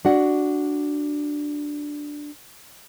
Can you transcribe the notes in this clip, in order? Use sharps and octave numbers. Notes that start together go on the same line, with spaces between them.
D4 F#4 F#5